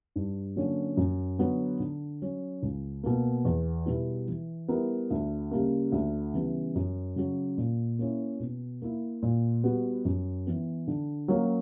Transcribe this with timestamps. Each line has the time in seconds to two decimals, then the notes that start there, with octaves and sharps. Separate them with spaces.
0.16 G2
0.56 D3 F#3 A#3 C#4
0.97 F#2
1.39 D3 F#3 B3
1.80 D3
2.22 F#3 C#4
2.63 C#2
3.04 B2 A#3
3.45 E2
3.86 B2 G3 B3 E4
4.28 E3
4.68 G3 B3 E4 A#4
5.11 D2
5.51 C#3 G3 A#3
5.92 D2
6.34 C#3 E3 G3 B3
6.75 F#2
7.16 C#3 F#3
7.58 A#2
7.99 A#3 C#4 E4
8.40 B2
8.82 A#3 E4
9.23 A#2
9.63 G3 B3 F#4
10.05 F#2
10.47 E3 B3
10.87 D3
11.28 F#3 A#3 C#4 F#4